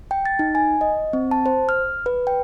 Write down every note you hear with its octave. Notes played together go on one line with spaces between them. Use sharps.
G5
A6
D#4
G#5
D#5
C4
A5
C5
F6
B4
G5